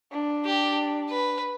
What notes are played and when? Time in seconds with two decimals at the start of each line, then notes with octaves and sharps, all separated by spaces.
0.12 D4
0.45 G4
1.10 B4